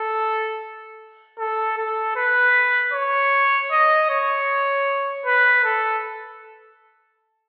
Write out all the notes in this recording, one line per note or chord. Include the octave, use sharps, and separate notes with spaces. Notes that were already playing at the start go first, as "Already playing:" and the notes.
Already playing: A4
A4
A4
B4
C#5
D#5
C#5
B4
A4